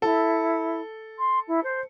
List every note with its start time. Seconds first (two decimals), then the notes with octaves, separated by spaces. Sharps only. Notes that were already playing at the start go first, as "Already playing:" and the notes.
0.02 E4 A4
1.18 C6
1.47 E4
1.63 C5